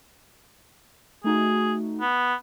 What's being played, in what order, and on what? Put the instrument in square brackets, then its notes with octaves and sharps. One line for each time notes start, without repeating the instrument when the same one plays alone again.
[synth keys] A3 D#4 F#4 [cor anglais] G#4
[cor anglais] B3